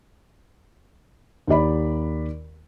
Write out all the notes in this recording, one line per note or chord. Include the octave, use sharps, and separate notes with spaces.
D#2 G4 D5 B5